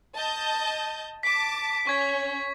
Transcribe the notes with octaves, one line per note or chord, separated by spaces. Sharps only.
D#5 A5 G6
A5 D6 B6
C#4 C#5 C#6 G#6 B6